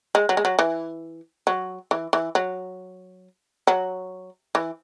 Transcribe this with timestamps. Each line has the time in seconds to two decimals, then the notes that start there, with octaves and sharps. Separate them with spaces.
0.15 G#3
0.29 F#3
0.37 G#3
0.45 F#3
0.59 E3
1.47 F#3
1.91 E3
2.13 E3
2.35 F#3
3.67 F#3
4.55 E3